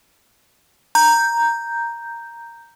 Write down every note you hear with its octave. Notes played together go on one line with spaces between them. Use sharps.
A#5 G6